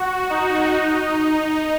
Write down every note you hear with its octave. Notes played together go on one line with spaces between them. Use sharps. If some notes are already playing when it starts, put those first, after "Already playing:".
Already playing: F#4
D#4
D#4
D#4